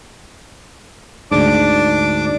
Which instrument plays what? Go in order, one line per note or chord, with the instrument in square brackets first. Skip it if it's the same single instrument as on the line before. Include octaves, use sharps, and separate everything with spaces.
[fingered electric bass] D2 G#2 [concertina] D4 D6